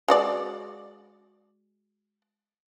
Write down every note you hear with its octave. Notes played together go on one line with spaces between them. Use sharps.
G#3 F#4 D5